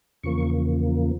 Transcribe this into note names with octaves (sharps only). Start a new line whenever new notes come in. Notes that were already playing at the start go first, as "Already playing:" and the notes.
E2 C#3 F3 A#3 C#6